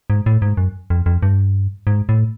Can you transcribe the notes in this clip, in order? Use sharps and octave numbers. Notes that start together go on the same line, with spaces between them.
G#2
A2
G#2
F#2
F2
F2
G2
G#2
A2